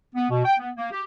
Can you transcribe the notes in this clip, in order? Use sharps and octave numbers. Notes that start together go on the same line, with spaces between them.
B3
B2
G5
B3
A#3
G4